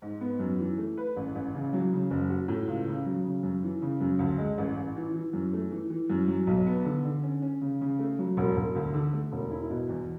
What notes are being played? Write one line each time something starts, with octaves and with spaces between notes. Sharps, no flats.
G#2
B3
F#2
E3
A3
B4
A1
A1
C#3
F#3
C#3
F#1
F#4
A2
C#2
C#3
F#3
C#3
F#2
E3
C#3
F#2
D2
G#3
A1
A1
E3
E3
F#2
A3
E3
E3
F#2
F#3
B1
B3
D3
D3
C#4
C#4
C#3
C#3
A3
F#3
E1
E1
D2
D3
A3
E1
E4
B2
E2